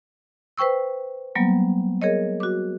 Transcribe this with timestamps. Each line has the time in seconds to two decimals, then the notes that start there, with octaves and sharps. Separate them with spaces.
0.58 B4 C5 G5 C#6 E6
1.35 F#3 G3 A#3 B3
2.02 G#4 A#4 C#5 D#5
2.40 F#4 D6